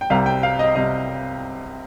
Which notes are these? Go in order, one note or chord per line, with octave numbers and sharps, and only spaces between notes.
G5
C2 C3 G3 F5
G5
F5
D#5
C3 G3 D#5